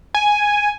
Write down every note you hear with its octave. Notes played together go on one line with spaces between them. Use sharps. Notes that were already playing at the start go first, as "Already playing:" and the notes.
G#5